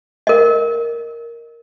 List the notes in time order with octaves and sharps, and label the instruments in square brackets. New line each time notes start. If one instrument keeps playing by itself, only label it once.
[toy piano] A#4 D#5